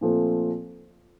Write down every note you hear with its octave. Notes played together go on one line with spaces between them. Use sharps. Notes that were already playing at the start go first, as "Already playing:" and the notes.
A#2 F3 A3 C4